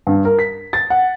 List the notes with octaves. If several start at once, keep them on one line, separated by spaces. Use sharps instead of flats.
G2
A#4
B6
A6
F#5